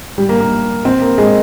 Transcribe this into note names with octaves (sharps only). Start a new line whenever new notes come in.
G3
A#3
A#3
C4
A#3
G#3